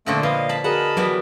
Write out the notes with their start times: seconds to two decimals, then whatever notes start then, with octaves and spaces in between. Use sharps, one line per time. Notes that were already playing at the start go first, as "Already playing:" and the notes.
0.06 A#2 D3 F3 A3 C4
0.23 F3 B4 D#5 F5
0.49 A5 B5
0.64 F#4 G#4 A#4 D#5 F#5 A5 B5
0.97 E3 F#3 G3 B3